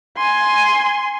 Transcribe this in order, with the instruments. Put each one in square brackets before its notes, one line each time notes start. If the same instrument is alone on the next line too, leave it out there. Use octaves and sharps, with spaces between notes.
[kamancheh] G#5 C6